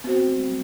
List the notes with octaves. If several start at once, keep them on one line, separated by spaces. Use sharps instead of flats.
B3 C4 F#4 C5
C4
A3
G3
F#3